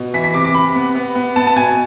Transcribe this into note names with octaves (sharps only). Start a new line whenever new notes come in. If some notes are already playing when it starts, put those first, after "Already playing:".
Already playing: B2
E3 B6
B6
C3 D6
D6
C3 B5
B3
B3
B3
B3 A5
A5
B2 G#5